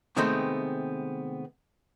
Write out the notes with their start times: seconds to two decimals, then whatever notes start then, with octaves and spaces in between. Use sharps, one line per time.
0.17 C3 D#3 G#3 A3 B3 C4